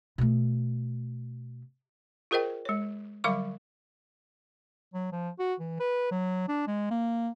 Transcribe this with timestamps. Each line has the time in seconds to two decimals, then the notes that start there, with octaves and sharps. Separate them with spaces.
0.18 B2 A3
2.31 F4 G#4 A#4 C5 D#5 G5
2.65 G#3 C#5
3.24 D3 F#3 G3 F5 C#6 D6
4.94 F#3
5.13 F3
5.39 F#4
5.60 E3
5.80 B4
6.11 F#3
6.49 D4
6.67 G#3
6.91 A#3